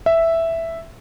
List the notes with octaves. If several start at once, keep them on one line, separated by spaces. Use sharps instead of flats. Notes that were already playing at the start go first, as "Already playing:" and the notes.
E5